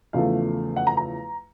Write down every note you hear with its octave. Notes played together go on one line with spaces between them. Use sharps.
E2 C#3 F3 A3 F5
F#5
A#5
A#5